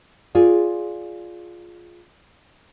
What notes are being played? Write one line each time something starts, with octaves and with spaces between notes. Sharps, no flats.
F4 G#4 D5